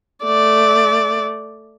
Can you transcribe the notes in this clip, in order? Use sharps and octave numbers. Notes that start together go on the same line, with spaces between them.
A3 D5